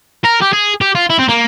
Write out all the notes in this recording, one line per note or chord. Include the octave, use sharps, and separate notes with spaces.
A#4
G4
G#4
G4
F4
E4
C4
A#3